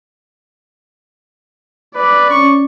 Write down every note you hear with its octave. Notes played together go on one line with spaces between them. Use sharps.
B4 D5
C#4 C#6